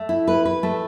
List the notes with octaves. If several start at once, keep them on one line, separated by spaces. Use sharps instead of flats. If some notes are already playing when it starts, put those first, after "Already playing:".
Already playing: A3
E4
B4
B4
A3